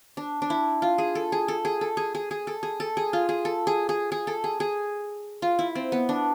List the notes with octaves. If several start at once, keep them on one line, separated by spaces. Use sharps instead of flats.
D4
D4
E4
F4
G#4
A4
G#4
A4
G#4
A4
G#4
G#4
G#4
A4
G#4
A4
G#4
F4
G#4
A4
G#4
G#4
G#4
A4
G#4
G#4
F4
E4
C4
B3
D4